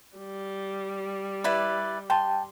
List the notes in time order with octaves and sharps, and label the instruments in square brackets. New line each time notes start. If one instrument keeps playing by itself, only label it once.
[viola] G3
[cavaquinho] E4 B4 D5
[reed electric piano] G5 A5 [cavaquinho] C6